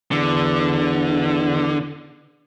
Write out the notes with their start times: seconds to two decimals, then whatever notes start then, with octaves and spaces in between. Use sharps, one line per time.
0.12 E2 D3